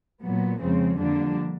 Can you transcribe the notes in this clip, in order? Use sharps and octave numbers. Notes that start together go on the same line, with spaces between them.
A#2 F#3 B3
F2 C#3 F3 G#3 C4
F2 D3 G3 A#3 D4